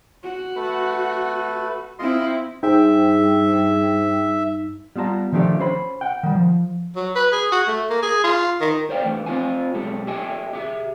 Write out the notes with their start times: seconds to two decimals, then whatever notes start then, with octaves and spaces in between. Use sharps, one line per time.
0.23 F#4
0.56 A3 B4
1.99 C4 E4 F4 D#5 C6
2.63 G2 D#4 G#4 C5 E5 G5
4.96 G3 B3 F4 A5 A#5
5.32 D#3 F3 A3 D4 G4
5.60 C#4 C5 B5
6.01 F#5 G5
6.23 D#3 G3
6.35 F3
6.96 F#3
7.15 B4
7.32 G#4
7.52 F#4
7.67 A3
7.90 A#3
8.02 G#4
8.24 F4
8.61 D#3
8.90 C5 D5 F5 G5
9.03 D3 E3 A3 B3
9.26 C4 F4 C5 F5 G#5
9.74 B1 G#3 G4 A4
10.07 G4 A4 D#5 E5 G5 G#5
10.53 G4 G#4 E5